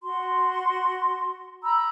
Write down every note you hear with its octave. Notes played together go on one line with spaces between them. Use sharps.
F#4 C6
A#5 B5 E6